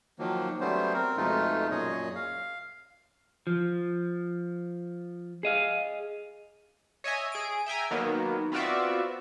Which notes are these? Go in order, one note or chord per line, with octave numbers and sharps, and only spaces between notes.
D#3 F3 F#3 A#3
F#3 G3 A3 B3 C#4 C5
C4 A#4
F2 B2 G#3 A3 D#4 F4
F#2 A#2 G#4 C#5 D#5
F5
F3
G#4 D#5 F5
C#5 D#5 E5 G#5
G#4 D7
E5 G5 G#5 A#5
D#3 F#3 A#3 B3
B3 C4 F4 F#4 D5 E5